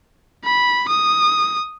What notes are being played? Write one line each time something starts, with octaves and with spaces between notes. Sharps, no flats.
B5
D#6